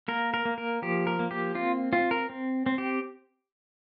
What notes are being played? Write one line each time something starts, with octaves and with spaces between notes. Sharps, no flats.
A#3 A#4
A#4
A#3
A#4
F3 G4
A#4
A#3
G4
C4 F4
C4 F4
A#4
C4
C4
G4